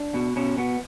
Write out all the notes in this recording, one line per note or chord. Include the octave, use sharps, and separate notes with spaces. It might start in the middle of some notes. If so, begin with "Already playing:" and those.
Already playing: D4
B2
B2 C#4
B2 B3